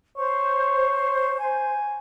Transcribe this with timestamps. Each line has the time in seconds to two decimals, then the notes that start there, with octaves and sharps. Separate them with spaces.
0.17 C5 C#5
1.39 G#5